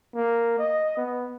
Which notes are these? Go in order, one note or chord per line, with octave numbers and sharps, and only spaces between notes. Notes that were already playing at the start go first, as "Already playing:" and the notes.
A#3
D#5
B3